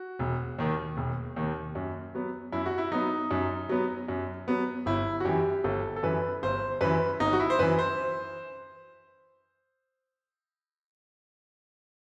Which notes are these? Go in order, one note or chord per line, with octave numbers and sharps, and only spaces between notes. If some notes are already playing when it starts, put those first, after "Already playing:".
Already playing: F#4
E1
D#2 D#3
E1
D#2 D#3
F#2
F#3 B3
F#2 E4
F#4
E4
F#3 B3 D#4
F#2
F#3 B3
F#2
F#3 B3
G1 E4
F#4
F#2 E3 G4
G1 A4
A4
F#2 E3 B4
G1 C5
F#2 E3 B4
G1 D#4
F#4
E4
C5
F#2 E3 B4
C5